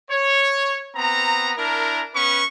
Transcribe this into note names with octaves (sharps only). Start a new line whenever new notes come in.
C#5
B3 C4 A#5
D4 E4 A#4
B3 C#4 B4 C#6